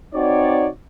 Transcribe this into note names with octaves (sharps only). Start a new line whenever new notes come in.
C4 D#4 F#4 C#5 D5